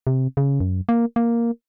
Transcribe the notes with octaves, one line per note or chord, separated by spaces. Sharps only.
C3
C#3
F#2
A#3
A#3